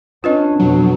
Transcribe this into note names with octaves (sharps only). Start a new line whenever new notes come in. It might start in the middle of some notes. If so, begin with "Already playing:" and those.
C#4 D4 F4 B4 D#5
F2 B2 F#3